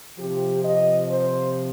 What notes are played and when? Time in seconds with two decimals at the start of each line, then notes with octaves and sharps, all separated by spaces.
0.18 C3 F3 G4
0.63 D#5
1.09 C5